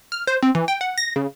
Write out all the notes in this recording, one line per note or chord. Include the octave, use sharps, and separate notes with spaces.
F6
C5
C4
E3
G5
F#5
A#6
C#3